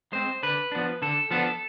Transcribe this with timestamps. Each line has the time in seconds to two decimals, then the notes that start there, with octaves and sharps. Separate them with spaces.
0.12 G#3 C4 C5
0.43 D3 B4
0.72 F3 B3 D4
1.02 D3 A4
1.31 F3 B3 D4 A4